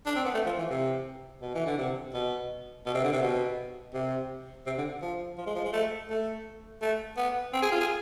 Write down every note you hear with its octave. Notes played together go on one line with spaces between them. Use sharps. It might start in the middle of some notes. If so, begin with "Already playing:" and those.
D4
C4
B3
A3
F3
E3
C3
B2
E3
D3
C3
B2
B2
C3
D3
C3
B2
C3
C3
D3
F3
F3
G#3
F3
G#3
A3
A3
A3
B3
C4
G#4
F4
G#4